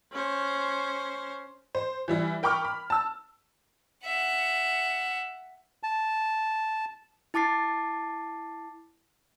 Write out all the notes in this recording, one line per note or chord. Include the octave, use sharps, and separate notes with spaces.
C#4 C5
C5
E3 G3 E4
A#4 G5 B5 C#6 D6 F6
B5
A5 E6
E5 F#5
A5
E4 A5 D6 A6 C7